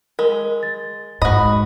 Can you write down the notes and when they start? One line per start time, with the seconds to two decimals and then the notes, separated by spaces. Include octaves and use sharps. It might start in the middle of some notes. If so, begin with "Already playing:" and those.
0.19 G#3 A#4
0.63 A6
1.22 G#2 F#4 D#5 B5